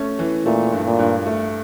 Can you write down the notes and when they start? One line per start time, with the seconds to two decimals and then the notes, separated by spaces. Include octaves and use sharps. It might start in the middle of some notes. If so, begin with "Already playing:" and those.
Already playing: A3 C#4
0.19 E3
0.45 A#2 A3
0.72 G2
0.86 A#2
0.99 G2
1.26 A3